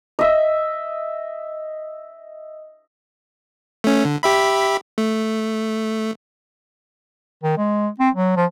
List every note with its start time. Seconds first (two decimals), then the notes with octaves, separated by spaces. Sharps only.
0.19 D#5 E5
3.84 A3 C#4
4.05 D3
4.23 G4 E5 B5
4.98 A3
7.44 D#3
7.58 G#3
8.00 C4
8.15 F#3
8.36 F3